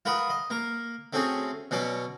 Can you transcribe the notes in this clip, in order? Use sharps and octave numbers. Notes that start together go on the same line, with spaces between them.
F4 A#4 B4 F#5 B5 D#6
D#5
A#3 A#4
A3 C4 C#4 F#4 G#4
B2 F#3 C#4 D5